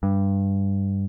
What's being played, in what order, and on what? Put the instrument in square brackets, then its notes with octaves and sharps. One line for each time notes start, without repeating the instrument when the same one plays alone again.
[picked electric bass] G2